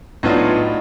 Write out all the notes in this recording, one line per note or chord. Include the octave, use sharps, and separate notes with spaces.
A2 F#3 B3 D4 D#4 F4 D#5